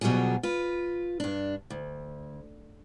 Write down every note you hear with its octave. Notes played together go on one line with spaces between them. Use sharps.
D2 B2 F#3 G3 F4 G#4
F4 B4
G2 D4
D2